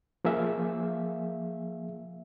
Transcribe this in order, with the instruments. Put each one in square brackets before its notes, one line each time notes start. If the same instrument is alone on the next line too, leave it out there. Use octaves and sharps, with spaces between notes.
[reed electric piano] F3 A#3 G#4 E5 F5